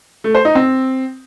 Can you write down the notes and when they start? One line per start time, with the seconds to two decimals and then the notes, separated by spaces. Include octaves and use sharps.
0.24 A3
0.35 C5
0.45 D#4
0.55 C4